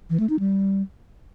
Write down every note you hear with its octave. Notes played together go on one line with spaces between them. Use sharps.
E3
A3
D#4
G3